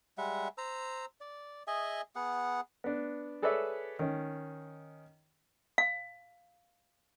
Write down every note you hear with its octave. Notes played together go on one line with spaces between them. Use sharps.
G3 G#3 E5 F#5
C5 A#5 E6
D5
G#4 D#5 E5 G#5
B3 G#4 F#5
B3 D4
G#4 A4 B4 C#5 D5 E5
D#3 C#4
F5